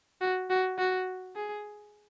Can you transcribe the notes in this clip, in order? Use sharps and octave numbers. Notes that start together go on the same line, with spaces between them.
F#4
F#4
F#4
G#4